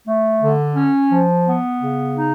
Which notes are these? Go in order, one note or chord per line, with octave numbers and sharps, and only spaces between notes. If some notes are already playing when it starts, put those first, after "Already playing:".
A3
D3
C#4
F3
B3
C#3
D#4